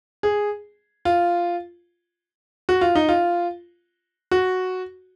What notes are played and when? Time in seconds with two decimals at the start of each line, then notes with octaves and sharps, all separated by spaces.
0.23 G#4
1.05 F4
2.69 F#4
2.81 F4
2.95 D#4
3.09 F4
4.31 F#4